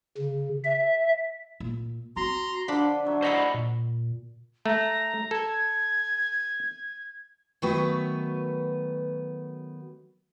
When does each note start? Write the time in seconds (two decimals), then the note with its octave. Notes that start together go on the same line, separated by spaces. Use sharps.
0.18 C#3
0.65 E5
1.60 A#2
2.17 C4 F#4 A#5 C6
2.68 D3 F3 D4 A4 B5 C6
3.05 D3 F#3 E5
3.22 E4 C5 D#5 F#5 B5 C6
3.54 A#2
4.66 A3 A#5
5.31 A4 G#6
7.62 D#3 F#3 A3 B3 F#4 B4